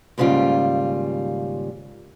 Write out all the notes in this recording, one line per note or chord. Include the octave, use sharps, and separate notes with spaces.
D#2 G#2 C#3 G3 F4